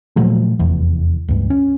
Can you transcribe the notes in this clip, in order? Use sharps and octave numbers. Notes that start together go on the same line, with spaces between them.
A#2 F3 F#3 A3
F1 E2
C#2 G2
C#4